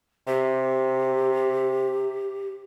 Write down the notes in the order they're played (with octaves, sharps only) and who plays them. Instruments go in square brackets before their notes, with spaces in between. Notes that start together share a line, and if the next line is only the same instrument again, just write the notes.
[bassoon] C3 [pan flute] G4